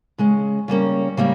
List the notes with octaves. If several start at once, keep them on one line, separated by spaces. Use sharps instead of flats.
C#3 G#3 C#4
C#3 G3 A#3 C#4
C#3 G3 A#3